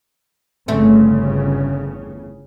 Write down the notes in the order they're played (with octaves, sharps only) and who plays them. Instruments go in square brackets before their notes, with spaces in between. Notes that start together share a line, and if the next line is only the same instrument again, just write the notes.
[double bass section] G1 C#3 [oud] E2 A3 C4